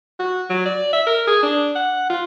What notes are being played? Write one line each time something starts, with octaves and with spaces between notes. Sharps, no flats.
F#4
F#3
D5
E5
A#4
G#4
D4
F#5
F4